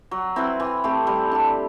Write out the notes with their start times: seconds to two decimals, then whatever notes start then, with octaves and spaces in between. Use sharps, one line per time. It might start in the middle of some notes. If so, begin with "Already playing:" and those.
0.11 F#3
0.36 C4 E4 B4
0.60 E3
0.84 A3 C4 G4
1.07 G3
1.31 D4 G4